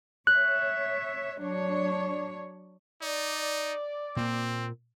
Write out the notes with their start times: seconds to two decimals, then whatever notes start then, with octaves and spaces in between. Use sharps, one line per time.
0.27 C#5 E5 F#6
1.39 F#3 D4 C#5
3.02 D#4 D5
4.16 A#2 A#3 C4